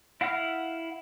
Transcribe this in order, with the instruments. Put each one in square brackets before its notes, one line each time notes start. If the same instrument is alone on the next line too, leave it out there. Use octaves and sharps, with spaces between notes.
[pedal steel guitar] E4 F5 F#5 F6